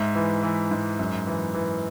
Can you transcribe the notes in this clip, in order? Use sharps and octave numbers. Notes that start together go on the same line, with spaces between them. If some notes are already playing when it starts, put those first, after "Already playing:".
Already playing: G#2 E5
E3
E3
G#2
F#2
E3
E3